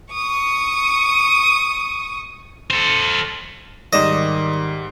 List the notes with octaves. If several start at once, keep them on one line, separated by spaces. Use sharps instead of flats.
C#6 D#6
A4 C5
G#2 D#3 G3 D5 D#5 D6 E7